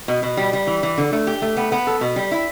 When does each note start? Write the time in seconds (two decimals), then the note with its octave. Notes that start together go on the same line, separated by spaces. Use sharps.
0.08 B2
0.23 B2
0.37 G3
0.53 G3
0.67 E3
0.83 E3
0.98 D3
1.13 A3
1.27 G4
1.42 A3
1.57 B3
1.72 B3
1.87 A4
2.01 B2
2.16 G3
2.32 E4